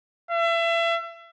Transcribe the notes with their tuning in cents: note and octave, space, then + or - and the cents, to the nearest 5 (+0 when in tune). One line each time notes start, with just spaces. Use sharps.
E5 +30